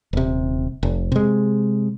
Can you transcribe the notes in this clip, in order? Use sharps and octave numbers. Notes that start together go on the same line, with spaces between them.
D#1 C3
F1
C3 G#3